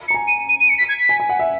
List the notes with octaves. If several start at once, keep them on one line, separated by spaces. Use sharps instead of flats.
A#5 C#7
G#5
D#7
D#7
D#7
C#7
B6
G#6
B6
G#5
G#5
F#5
E5